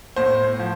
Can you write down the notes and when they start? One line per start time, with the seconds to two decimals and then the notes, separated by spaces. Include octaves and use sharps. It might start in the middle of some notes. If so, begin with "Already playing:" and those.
0.16 A2 C5
0.59 F3